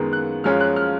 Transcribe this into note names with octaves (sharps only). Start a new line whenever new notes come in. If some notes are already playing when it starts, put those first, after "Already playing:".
Already playing: F#2 D#3 G#3 B3
F#6
F#2 F3 G#3 C#4 F6
F#6
F6